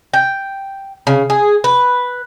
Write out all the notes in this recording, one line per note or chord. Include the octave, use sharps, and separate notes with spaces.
G5
C#3
G#4
B4